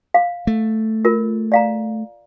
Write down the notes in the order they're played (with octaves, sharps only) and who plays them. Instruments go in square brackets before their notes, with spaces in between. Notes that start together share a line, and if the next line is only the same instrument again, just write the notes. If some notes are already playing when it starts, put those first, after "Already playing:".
[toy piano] F5
[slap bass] A3
[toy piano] F4 A#4
D5 F5 A#5